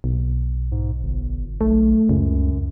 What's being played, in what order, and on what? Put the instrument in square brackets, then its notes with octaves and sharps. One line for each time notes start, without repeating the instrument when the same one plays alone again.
[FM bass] B1
[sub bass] G#2
G1
[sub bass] B1 [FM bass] A3
[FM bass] C#2 [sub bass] F#2